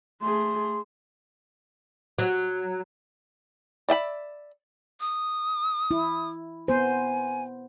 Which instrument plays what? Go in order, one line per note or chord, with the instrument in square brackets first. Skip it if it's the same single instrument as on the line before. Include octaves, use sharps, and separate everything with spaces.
[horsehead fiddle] A3 G#4 [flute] C6
[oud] F#3
[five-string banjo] D5 E5 G5 B5
[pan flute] D#6
[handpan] E4
[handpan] B3 C5 [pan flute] G#5